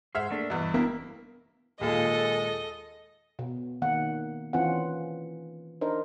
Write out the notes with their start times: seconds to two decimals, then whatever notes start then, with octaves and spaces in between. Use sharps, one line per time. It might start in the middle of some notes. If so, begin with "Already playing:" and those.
0.15 G#2 G#4 C5 E5 F#5 F6
0.30 A3 A#3 D4
0.50 E2 G2 B2
0.74 A#3 B3 D4 E4 G4
1.81 D#2 A#2 G#3 F4 A4 D#5
3.39 B2
3.82 D#3 A#3 F#5
4.53 E3 C4 C#4 F4 F#5
5.81 D4 D#4 A#4 C5